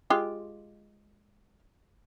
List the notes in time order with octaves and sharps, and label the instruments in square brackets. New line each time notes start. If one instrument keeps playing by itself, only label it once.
[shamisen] G#3 F4 G4